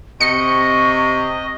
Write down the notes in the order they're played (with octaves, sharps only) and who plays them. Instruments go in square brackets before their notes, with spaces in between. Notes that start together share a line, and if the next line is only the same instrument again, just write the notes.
[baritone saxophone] C3 [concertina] D#5 [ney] C#6 [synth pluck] C#7